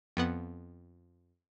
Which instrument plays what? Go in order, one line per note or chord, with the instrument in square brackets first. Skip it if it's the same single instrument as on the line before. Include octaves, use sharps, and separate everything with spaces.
[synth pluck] F2 B3 F#5